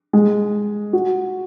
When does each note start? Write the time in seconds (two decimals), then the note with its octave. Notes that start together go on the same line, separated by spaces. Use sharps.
0.13 G#3
0.93 F#4